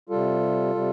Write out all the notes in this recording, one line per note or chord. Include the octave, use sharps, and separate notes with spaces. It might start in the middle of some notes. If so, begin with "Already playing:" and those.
C3 G3 F4 A4
C3 G3